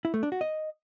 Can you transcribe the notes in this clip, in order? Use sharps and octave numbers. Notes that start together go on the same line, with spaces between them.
E4
A3
D4
F#4
D#5